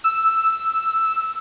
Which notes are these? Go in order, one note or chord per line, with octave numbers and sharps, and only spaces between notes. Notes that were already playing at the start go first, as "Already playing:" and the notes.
E6